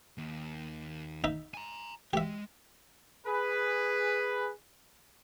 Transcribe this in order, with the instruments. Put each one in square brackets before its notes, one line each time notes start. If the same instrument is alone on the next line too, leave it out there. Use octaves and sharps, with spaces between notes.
[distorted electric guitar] D#2
[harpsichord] D#4 E5
[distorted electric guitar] G#5 A#5
[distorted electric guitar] G#3 [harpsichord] G4 E5
[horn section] G#4 B4